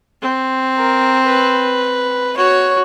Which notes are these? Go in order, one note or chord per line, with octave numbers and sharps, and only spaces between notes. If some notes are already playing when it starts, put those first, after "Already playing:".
C4
A#4
B4
F#4 C#5